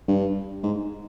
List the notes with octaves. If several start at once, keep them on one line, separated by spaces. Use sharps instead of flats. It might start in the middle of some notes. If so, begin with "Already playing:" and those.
G2
G#2